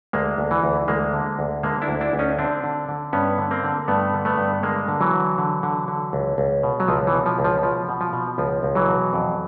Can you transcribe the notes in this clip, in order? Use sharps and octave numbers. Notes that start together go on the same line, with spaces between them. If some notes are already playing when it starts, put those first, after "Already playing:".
D2 G#3 A#3
D2
E3
D2
D2 G#3 A#3
D3
D2
D3 G#3 A#3
D4 E4
D2
D4 E4
D2
C#4 D#4
D3 C4 D4
D3
D3
G2 B3 C#4
D3
A#3 C4
D3
G2 A3 B3
D3
A3 B3
G2
D3 G#3 A#3
D3
E3 F#3
D3
D3
D3
D3
C#2
C#2
B2
F#3
C#2 F3
E3
B2
F3
C#2
F3
B2 F3
B2
F3
B2
C#2 F3
C#2
E3 F#3
B2
F2